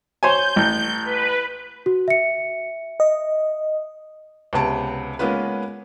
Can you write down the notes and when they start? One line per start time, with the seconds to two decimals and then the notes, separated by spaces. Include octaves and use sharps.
0.23 C5 C#5 G#5 G6
0.56 A1
1.05 B4
1.86 F#4
2.08 E5 C#7
3.00 D#5
4.53 C#2 C3 B3 A5 D7
5.19 G#3 A#3 B3 C#4 F4 B4